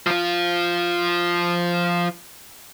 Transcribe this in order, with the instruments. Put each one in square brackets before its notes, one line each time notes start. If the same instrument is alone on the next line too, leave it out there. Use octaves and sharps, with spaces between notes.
[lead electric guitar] F3 F4